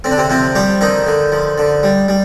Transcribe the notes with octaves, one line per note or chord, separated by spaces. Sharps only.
D3 C4
D4
C3 C4
C3 F3 C4
F3 G3 G4
D3 D#3 D#4
D3
F3
D3
G3
G3